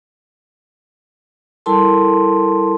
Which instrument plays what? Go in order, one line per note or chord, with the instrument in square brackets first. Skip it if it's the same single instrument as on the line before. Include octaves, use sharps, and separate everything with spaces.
[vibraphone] G3 E4 A4 A#4 A5 C6